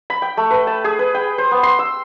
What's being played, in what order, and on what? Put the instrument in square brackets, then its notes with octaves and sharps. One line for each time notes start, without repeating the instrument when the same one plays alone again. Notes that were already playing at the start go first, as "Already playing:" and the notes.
[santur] B5
G5
A3
B4
A5
G#4
B4
G5
C5
B3
C6
E6